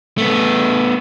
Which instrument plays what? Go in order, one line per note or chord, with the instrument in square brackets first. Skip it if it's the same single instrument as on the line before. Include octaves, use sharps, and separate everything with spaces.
[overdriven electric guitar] A3 B3